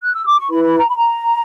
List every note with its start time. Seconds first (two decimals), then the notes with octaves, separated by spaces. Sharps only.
0.02 F#6
0.14 E6
0.26 D6
0.38 C#6
0.50 E4 B4 B5
0.64 B5
0.78 A#5
0.88 B5
0.96 A#5